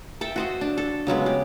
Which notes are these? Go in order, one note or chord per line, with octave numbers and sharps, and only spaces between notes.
A4 E5 G5
F#4 C5 D#5
D4
A4
C#3 F#3 G#3 B3
G4